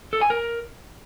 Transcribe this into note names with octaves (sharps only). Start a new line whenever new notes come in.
A4
G#5
A#4